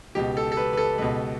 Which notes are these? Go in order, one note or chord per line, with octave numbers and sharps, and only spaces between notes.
C#2 B2 G4
A4
A4
B4
B4
A4
C#2 B2 B4